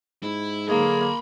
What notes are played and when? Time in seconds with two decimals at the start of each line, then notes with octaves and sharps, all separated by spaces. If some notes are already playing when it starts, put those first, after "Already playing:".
0.23 G#2 E4
0.69 D3 F#3 A#3 G#4 A#5 B5